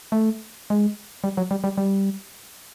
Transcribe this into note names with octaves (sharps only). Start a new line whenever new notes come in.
A3
G#3
G3
F#3
G3
G3
G3